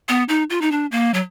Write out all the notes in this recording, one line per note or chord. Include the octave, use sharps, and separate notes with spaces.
B3
D#4
F4
D#4
D4
A#3
F#3